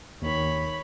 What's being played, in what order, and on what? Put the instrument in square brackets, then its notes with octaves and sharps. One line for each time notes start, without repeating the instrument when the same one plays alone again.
[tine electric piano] D#2 D#3 [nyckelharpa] C#5 B5